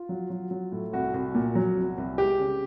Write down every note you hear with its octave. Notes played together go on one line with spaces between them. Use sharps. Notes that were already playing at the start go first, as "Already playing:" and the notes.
Already playing: F4
F#3
F#3
F#3
A2
C2 F#4
C2
A#2
F#3
C2
C2
G#3 G4
C#3